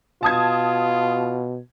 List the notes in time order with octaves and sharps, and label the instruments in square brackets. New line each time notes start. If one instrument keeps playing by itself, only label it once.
[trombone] B2 [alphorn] F4 [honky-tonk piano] A5 D#6 G#6